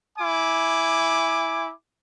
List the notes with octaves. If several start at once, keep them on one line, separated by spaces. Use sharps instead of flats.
E4 G#5 D6